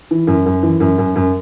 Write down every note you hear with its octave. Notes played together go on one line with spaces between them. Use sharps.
E3
F#2
F#2
E3
F#2
F#2
F#2